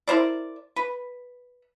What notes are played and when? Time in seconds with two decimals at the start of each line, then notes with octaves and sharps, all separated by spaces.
0.08 E4 A#4 C5 D5
0.76 B4